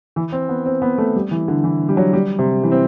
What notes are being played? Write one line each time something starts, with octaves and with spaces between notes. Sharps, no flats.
E3
C4
B3
C4
B3
A3
G3
E3
D3
E3
G3
F#3
G3
C3
E3
C4